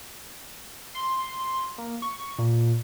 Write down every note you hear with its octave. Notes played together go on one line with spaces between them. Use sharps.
C6
A#3
C#6
A#2